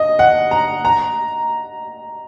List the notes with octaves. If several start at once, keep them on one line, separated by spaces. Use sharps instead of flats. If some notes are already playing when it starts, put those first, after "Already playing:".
Already playing: D#5
F#5
A#5
A#5